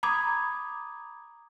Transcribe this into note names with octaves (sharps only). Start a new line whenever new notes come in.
A#5 B5 D6 D#6 G#6